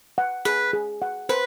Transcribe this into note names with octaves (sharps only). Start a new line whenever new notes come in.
F#5
G#4 B4
G#4
F#5
B4 C5